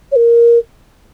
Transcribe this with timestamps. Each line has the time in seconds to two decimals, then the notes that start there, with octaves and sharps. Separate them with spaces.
0.11 C#5
0.16 A#4